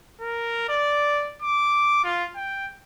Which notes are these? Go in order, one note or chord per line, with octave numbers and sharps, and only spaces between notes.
A#4
D5
D6
F4
G5